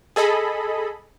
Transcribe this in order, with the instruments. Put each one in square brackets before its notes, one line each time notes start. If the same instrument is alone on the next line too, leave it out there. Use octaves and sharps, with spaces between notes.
[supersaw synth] G#4 A4 D#5 B5